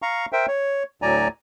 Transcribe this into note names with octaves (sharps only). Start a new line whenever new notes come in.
F5 A#5 C#6
A#4 C5 E5 G5
C#5
D2 A2 F#3 D5 G#5 A#5